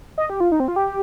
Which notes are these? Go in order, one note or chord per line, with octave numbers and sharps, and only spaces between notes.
D#5
G4
F4
D#4
C4
F4
G4